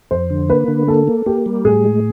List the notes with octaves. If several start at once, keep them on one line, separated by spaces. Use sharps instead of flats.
F2 C5
D3
A#3 B4
D3
A#3 A4
A#3
A#3 G4
G3
A2 G#4
G#3